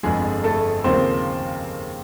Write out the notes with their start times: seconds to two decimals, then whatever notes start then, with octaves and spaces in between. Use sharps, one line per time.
0.03 G1 F2 D3 F3 G#3 G#4
0.44 A3 A4
0.84 D#2 C#3 F3 A#3 C4 C5